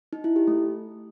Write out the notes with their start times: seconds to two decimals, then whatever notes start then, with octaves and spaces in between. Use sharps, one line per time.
0.13 D#4
0.24 E4
0.36 G4
0.48 A3